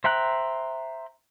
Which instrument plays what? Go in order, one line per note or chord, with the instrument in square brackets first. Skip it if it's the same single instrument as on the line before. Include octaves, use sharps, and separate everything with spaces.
[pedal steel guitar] C5 E5 G5 A#5 F#6